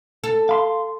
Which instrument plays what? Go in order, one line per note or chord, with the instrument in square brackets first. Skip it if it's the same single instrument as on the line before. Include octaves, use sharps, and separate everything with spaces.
[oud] A4
[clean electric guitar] F5 B5 C6